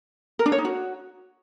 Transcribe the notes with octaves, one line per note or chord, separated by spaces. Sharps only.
A#4
D4
C#5
D#4
F#4